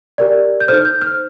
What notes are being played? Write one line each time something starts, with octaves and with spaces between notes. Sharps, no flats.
G4 A#4 D5
G6
D#4 A4 C5 F6
G6
F6